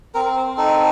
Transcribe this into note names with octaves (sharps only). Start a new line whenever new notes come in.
C4 A#4
C5
D#4 A4